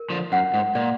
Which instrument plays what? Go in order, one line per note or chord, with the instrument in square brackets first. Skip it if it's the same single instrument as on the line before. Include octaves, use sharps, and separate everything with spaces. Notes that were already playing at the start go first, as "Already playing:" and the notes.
Already playing: [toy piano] A#4
[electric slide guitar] D3 F3
[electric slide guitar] F#2 [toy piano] F#5
[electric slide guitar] G#2
[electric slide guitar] A#2 [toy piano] D5